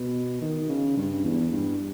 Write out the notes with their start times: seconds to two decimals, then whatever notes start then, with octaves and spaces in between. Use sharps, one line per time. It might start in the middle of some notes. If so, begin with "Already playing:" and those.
Already playing: B2
0.42 D#3
0.69 C#3
0.97 G2
1.24 E2
1.52 G2